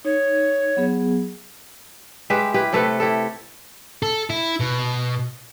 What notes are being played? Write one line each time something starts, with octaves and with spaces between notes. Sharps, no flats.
D#4 C#5
F#3 B3 G#4
G#3 G4 B4 E5
E4 G4 B4
C3 A3 A4 B4
E4 G4 A4
A4
E4
B2